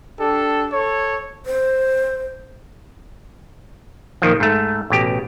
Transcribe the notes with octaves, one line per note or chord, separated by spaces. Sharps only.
D4 G4 A4
A4 C#5
C5
A#2 D#3 F3
G#2 A3
A1 B2 G4